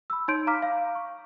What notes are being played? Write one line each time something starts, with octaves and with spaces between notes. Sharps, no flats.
B5 E6
D#4 C#5 C6 G6 D7
F5 A#5 D6 F6 B6
F5
C#6